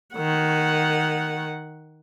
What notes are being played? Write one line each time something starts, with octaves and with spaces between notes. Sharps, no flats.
D#3 F#5